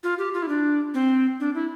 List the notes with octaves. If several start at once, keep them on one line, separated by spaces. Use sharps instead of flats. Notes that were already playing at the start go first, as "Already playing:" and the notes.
F4
G4
F4
E4
D4
C4
D4
E4